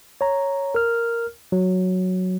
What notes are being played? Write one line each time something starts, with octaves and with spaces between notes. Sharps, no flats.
C#5 A#5
A#4 F6
F#3